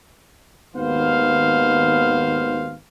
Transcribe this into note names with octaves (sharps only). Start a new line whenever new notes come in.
G#1 D#2 B3 C5 F5